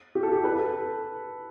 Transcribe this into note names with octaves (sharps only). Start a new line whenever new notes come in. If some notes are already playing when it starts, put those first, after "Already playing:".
G4
A4
G4
B4
A4